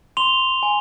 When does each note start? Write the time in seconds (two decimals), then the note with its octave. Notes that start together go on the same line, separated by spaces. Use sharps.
0.17 C6 F7 G7
0.63 G#5